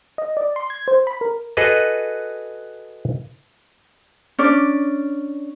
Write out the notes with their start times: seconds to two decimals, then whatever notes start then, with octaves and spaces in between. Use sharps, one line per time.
0.18 D#5
0.37 D5
0.56 C6
0.70 G#6
0.88 C5
1.07 B5
1.21 A#4
1.57 F#4 G#4 A4 B4 D#5
4.39 C#4 D4 D5